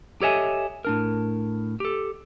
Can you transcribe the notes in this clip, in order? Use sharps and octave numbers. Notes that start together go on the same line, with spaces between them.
G4 A4 C#5 D#5 E5 G#5
A2 D4 A#4
G4 A4